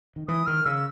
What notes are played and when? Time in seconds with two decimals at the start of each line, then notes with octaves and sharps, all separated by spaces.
0.16 D#3
0.28 E3 D#6
0.46 D#3 F6
0.65 C#3 E6